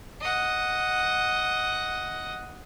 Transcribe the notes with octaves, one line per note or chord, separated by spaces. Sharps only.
D#5 F#5